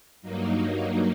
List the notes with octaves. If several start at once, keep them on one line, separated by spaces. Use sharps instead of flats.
G2 F#3 A#3 D#4